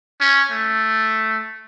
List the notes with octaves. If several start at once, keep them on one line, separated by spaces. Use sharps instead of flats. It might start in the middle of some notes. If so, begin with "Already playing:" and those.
C#4
A3